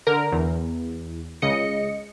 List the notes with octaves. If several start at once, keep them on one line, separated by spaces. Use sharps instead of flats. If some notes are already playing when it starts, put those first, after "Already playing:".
D3 A#4 A#5
E2
C#2 C#3 D#5 C#7